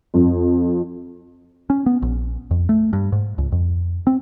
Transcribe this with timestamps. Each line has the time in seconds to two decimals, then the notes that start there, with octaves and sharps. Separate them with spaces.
0.14 F2
1.70 C#4
1.86 B3
2.02 A#1
2.51 F2
2.69 A3
2.93 G2
3.12 G#2
3.38 C#2
3.52 F2
4.07 C4